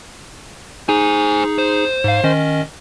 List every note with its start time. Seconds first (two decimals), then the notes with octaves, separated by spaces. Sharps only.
0.89 D#4 G#4 C5 G#5
1.58 C5
2.04 G#2 F5
2.24 D#3 C#4 D#5